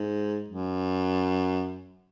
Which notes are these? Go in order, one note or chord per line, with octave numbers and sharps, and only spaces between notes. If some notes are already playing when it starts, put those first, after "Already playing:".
Already playing: G#2
F#2